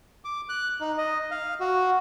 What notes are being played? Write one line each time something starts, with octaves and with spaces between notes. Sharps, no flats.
D6
F#6
D#4
D#5
F5
F#4